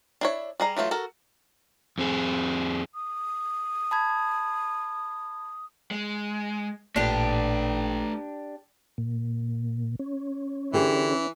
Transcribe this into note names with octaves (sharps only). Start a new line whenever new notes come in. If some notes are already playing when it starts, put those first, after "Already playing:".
D4 E4 C#5
G3 G#4 A#5
E3 F#3 A3 F4
F#4 A4 A#4
F2 C4 G#4
D#6
A5 B5 G#6
G#3
A1 A#2 A3 D4 G4 B4
A#2
C#4
D3 E3 G4 G#4